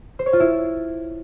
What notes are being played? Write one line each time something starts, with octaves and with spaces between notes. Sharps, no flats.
C5
C#5
F4
E4